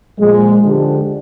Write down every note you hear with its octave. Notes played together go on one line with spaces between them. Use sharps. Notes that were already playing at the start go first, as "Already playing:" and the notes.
A#2 F3 G#3
D3 F3 G#3 D4 G4